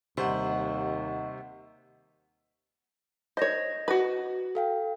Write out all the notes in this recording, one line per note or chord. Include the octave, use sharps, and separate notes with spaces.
D#2 C3 G3 C5 D#5 F#5 C#6
C5 C#5 D#5 A#6
F#4 B4
A4 F5 G5